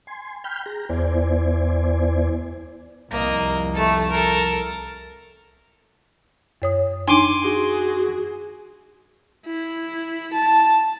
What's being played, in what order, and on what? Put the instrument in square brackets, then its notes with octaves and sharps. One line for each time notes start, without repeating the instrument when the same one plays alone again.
[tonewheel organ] G#5 C6
G5 B5 F6 G6
G#4 A#5
E2 B3 E4 C5 D5 G#5
[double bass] C2 F2 [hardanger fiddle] A#3 D#5
[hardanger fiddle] A3 A4
A4 A#4
[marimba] F#2 C#5 D#6
[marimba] D4 D#4 [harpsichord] G#5 C6 D6
[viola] F#4 G#4
[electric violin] E4
A5